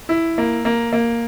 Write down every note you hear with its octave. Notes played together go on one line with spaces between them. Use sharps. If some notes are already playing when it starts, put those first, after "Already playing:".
E4
A#3
A#3
A#3